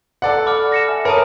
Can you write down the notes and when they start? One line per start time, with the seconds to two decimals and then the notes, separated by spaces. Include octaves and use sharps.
0.22 A4 D5 F#5
0.46 B5 D6 F6
0.72 A#6 C#7 E7
0.88 E5 G#5 F6
1.05 A#4 C#5 A5 B5 D#6 D#7